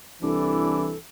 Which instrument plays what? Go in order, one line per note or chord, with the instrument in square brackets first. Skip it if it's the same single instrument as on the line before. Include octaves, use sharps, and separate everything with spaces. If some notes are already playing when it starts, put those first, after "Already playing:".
[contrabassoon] C2 [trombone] E3 [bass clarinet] D4 [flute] A4